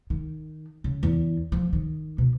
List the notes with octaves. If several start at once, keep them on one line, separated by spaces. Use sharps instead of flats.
D#3
C#3
E2
F3
D#3
B2